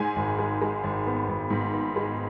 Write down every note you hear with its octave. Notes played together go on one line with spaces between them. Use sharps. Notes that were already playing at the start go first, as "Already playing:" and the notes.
Already playing: G#2 G#3 G#5
G#1
G#3
G#3
G#1
B3
G#1
G#2
B3
G#3